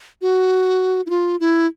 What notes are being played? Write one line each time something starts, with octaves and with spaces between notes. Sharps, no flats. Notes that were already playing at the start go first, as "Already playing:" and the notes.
F#4
E4
F4
E4